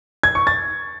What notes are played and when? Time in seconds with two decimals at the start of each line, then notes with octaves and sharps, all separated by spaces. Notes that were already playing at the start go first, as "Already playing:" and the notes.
0.23 G#6
0.35 C#6
0.47 A6